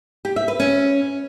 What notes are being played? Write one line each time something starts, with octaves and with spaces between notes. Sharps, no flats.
G4
E5
B4
C#4